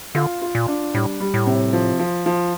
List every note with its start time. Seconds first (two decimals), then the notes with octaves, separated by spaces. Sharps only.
0.15 D3 F4
0.41 F4
0.55 A#2
0.68 D4
0.94 A2 G3
1.20 G3
1.34 A2
1.46 C3
1.73 F3
1.99 F3
2.26 F3